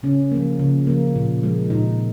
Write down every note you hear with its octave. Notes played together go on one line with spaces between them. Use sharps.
C#3 C#4
F3 A#3
C#3
F3 A#3
A#2
F3 G#3
A#2 D#4